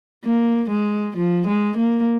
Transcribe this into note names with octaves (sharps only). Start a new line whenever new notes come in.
A#3
G#3
F3
G#3
A#3